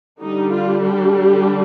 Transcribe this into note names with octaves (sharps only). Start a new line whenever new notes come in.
D3 G3 D4 D#4
F4
G4
G4